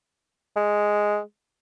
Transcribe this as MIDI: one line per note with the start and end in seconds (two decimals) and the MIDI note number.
0.56 1.20 56